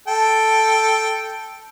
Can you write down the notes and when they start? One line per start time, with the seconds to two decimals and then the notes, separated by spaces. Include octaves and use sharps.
0.08 A4 G5